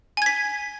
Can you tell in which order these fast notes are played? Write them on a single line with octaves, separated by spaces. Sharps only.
G#5 G#6 B6